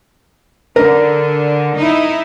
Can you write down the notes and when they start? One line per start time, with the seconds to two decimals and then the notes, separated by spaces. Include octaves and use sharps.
0.76 D3 A#4
1.78 D#4 E4